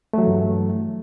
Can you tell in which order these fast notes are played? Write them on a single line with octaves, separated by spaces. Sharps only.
A3 F#3 E3 G2